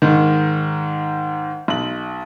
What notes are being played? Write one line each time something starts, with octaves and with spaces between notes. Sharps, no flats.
G#2 D#3
B1 F#7